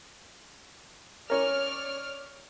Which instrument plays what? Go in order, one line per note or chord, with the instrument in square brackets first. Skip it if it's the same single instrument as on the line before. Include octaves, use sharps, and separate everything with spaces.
[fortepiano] C#4 A#4 [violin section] C#5 D5 F6